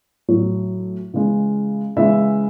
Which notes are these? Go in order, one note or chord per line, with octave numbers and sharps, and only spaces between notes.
A2 F#3
C#3 E3 G#3
C#3 E3 G#3 E5